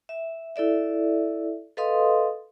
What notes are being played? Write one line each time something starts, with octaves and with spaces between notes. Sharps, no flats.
E5
E4 A4 D5 E5
A4 B4 D#5 F5 C6 D#6